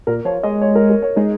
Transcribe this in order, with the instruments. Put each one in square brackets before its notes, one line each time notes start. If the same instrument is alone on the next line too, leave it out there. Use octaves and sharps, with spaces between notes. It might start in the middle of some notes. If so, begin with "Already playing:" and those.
[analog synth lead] A#2 [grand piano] A#4
[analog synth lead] F3 [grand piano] C#5
[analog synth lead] G#3 [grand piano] D#5
[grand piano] C#5
A#4
A#4
C#5
[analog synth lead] G#3 [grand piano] D#4